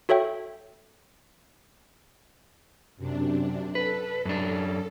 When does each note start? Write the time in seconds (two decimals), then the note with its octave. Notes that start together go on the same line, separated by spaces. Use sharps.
0.09 F#4 A4 C#5 E5 G5
2.97 F#2 C3 D4
3.75 A4 B4
4.25 F#2 D4